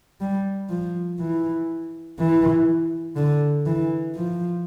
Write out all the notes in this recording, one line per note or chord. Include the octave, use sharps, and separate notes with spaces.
G3
F3
E3
E3
D3
E3
F3